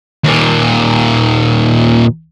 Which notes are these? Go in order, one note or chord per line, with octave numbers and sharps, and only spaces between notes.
D#2 A#2